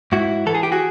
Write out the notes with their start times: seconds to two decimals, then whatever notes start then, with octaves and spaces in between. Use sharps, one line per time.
0.12 G#2 E4 F#4
0.46 E3 A4
0.55 G#4
0.63 G4
0.72 F#4 G#4